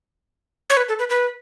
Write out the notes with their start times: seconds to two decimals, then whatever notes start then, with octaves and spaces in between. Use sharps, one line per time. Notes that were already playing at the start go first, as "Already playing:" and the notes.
0.70 C#5
0.77 B4
0.89 A4
0.99 B4
1.10 B4